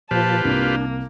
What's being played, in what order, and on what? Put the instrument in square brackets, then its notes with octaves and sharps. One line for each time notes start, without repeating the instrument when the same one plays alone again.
[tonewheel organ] A#2 F3 [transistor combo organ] F4 G4 B4 [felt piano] C5 [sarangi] A5
[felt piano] C2 [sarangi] A#3 [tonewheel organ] D4